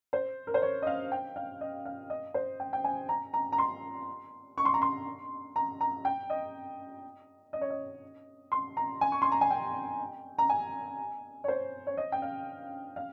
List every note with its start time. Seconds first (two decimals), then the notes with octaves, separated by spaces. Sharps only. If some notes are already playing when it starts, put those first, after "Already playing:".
0.13 C5
0.47 A#4
0.54 C5
0.62 C#5
0.82 D#5
0.87 F5
1.12 G5
1.36 F5
1.61 D#5
1.85 F5
2.10 D#5
2.34 C5
2.60 G5
2.73 G5
2.84 G#5
3.09 A#5
3.34 A#5
3.52 A#5
3.58 C6
4.58 C#6
4.65 C6
4.74 A#5
4.82 C6
5.56 A#5
5.81 A#5
6.05 G5
6.30 D#5
7.53 D#5
7.61 C#5
7.70 D#5
8.52 C6
8.77 A#5
9.01 G#5
9.12 C#6
9.22 C6
9.32 A#5
9.41 G#5
9.51 G5
10.38 A#5
10.50 G#5
11.44 C#5
11.48 C5
11.87 C#5
11.97 D#5
12.12 G5
12.22 F5
12.96 F5